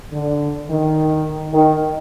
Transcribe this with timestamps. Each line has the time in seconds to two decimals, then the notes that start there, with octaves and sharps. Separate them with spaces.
0.12 D3
0.69 D#3
1.53 D#3